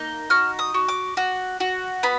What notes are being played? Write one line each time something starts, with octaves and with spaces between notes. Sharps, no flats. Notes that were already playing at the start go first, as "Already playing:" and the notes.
Already playing: A#3 D#4
F#4 F6
D#6
F#4
D6
F#4
F#4
B3 B5